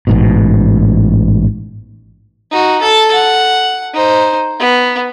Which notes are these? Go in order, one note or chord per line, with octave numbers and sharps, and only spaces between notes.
A1 G#2 B2
D#4 F#4
A4 A5
F#5
D#4 C5
B3